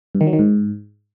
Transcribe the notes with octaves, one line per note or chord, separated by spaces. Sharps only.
G2
D#3
F#3
D#3
G#2